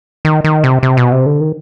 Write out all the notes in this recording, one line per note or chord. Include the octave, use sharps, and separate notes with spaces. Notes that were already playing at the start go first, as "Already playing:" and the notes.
D#3
D#3
C3
C3
B2
C3
D3
D#3